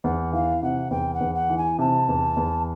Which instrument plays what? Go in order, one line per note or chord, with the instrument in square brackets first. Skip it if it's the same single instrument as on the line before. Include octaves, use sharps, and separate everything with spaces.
[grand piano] E2 [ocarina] F#5
[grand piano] E3 [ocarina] F5
[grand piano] C3 [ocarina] F#5
[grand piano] E2 [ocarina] G5
[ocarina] F#5
[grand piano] E2
[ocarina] F#5
[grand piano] E3
[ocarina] G#5
[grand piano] C3 [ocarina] A5
[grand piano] E2
E2